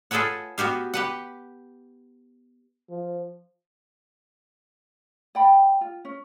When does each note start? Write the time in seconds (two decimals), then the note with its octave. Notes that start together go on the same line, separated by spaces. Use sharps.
0.11 F4 G#4 A4 B4 C#5 F#5
0.58 B3 F#4 G4 F5
0.94 G4 B4 F#5
2.90 F3
5.35 D5 G5 B5
5.81 F4
6.05 C#4